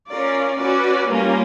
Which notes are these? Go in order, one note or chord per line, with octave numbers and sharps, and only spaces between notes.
C#4 F4 A#4 D5
C#4 F#4 B4 D5
G3 A#3 C#4 F4 A#4